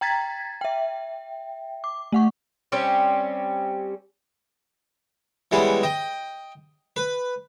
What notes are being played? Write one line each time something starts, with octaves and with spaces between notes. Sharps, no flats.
G5 A#5 G#6 A6 B6
E5 G5
D6
A3 F#5 C#6
G3 C4 C#4 G4
E3 G3 G#3 B3 C#4
D#5 G5
B4